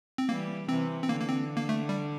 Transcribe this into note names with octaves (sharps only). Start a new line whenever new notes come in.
C4
E3 G3 A#3
C3 E3 C4
C4
D3 A#3
A#3
C4
A#3
A3
G3